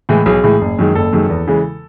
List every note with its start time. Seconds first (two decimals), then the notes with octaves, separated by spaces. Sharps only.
0.09 A2 E3 G#3
0.26 B1 G#4
0.44 A2 E3 G#3
0.61 F#1
0.79 F#2 D#3 G#3
0.95 F#1 A4
1.13 F#2 D#3 G#3
1.30 E2
1.47 C#3 E3 G#3